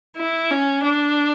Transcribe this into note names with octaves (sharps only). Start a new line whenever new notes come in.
E4
C#4
D4